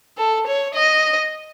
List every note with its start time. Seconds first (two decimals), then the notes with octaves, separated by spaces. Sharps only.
0.18 A4
0.47 C#5
0.75 D#5